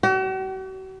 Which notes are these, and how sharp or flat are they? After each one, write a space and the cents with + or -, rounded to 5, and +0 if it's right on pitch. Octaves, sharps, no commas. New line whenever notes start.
F#4 +45